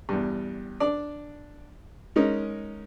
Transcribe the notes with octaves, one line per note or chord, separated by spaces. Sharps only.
E2 G2
D4 D5
G#3 C#4 D#4 A#4